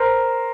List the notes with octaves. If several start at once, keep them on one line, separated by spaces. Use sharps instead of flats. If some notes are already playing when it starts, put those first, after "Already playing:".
Already playing: A#4 C5